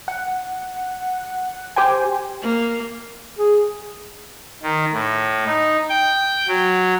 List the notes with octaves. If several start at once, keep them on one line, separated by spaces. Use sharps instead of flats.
F#5
G4 C5 G5 G#5
A#3
G#4
D#3
A2
D#4
G5
F#3